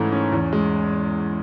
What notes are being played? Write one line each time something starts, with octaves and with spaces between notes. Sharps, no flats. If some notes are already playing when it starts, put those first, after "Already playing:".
Already playing: G#2 E3 A3 C#4
C#4
E2
G#3